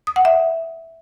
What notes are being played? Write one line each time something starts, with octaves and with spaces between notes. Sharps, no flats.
D#6
F#5
E5